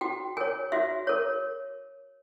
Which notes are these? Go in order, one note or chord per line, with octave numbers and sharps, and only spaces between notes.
F#4 G5
A#4 C#5 G#5
F#4 E5
A#4 C#5